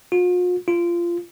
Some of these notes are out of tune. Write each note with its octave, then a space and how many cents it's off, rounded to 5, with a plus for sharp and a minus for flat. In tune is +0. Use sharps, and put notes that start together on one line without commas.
F4 +45
F4 -20